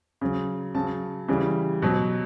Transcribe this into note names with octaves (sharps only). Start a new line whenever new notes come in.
C#3 F#3
C#3 F#3 A5
C#3 E3 G3
B2 F#3